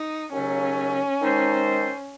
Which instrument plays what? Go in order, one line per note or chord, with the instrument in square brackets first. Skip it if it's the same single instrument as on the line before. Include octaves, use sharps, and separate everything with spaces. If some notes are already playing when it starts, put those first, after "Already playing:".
Already playing: [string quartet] D#4
[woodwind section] D#2 C#3 F#3 A3 [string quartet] C#4
[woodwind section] D#3 G#3 D#4 A4 C5